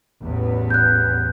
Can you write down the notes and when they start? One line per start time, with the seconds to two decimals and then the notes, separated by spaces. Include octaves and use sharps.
0.23 A1 E2 B3
0.70 F#6 G6